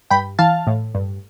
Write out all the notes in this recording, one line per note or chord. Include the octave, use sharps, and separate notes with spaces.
G2 G5 B5
E3 F5 A5
A2
G2